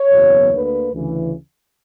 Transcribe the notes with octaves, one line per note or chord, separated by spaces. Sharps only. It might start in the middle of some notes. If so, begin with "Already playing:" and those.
Already playing: C#5
F#1 E2 B2 F#3 B3
D2 D3 A#3 B4
D2 C#3 E3